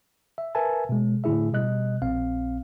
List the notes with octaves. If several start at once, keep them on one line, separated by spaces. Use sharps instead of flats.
E5
A#4 B4 E5 G#5 A5
B2 G#3
A2 D3 A3 E4 G#4 E5
B2 G3 D#5 F#6
A#1 C4 F5